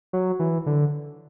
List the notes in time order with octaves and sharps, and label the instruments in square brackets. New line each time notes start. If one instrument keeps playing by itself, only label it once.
[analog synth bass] F#3
E3
D3